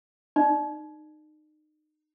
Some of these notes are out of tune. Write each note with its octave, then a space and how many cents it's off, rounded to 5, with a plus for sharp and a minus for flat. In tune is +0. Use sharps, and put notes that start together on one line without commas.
D#4 -25 D5 +30